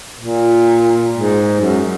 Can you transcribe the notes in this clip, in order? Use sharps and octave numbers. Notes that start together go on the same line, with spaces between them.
A#2
G#2
F#2